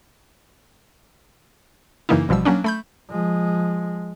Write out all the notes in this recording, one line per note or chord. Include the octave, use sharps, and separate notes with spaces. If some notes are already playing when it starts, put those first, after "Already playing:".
F#2 C#3 E3 A#3 D#4 E4
A1 B2 F3 G3 E6
F#3 A#3 C#4 D4
A3 B5 G6
F3 G#3